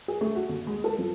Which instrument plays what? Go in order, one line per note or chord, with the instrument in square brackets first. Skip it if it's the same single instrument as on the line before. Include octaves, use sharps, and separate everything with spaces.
[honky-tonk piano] G#4
A3
F#4
D#2
G#3
A4
F3